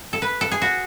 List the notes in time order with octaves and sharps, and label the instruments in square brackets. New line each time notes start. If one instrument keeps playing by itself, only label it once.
[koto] A4
B4
A4
G#4
F#4